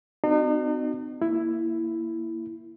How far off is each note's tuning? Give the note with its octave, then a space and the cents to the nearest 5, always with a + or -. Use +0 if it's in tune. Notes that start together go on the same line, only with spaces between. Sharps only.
C4 -45 D#4 -45 F#4 +0
A#3 +0 E4 +5